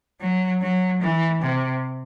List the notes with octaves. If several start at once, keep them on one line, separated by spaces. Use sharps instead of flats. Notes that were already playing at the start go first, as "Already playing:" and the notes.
F#3
F#3
E3
C3